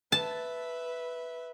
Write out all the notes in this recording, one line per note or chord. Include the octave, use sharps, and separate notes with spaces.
B4 E5 A5